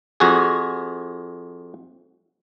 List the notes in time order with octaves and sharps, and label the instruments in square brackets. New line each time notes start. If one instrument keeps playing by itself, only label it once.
[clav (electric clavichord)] F2 F#4 G#4